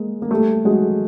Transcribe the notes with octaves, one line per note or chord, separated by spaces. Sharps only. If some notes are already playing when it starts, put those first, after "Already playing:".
Already playing: G#3 A#3
A#3
G3 A3
F#3 G#3